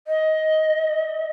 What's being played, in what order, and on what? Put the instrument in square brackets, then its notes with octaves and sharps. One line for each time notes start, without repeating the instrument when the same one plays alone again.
[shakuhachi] D#5